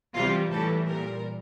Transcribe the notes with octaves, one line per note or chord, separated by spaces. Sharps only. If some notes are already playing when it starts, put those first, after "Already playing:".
C3 E3 G3 F4
A2 E3 G3 A4
A#2 G3 A#4